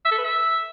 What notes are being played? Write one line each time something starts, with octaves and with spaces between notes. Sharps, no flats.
E5
A4
B4
E5